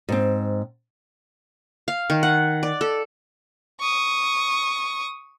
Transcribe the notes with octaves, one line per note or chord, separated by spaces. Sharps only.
G#2 C4
F5
D#3
F#5
D5
A4
C#6 D#6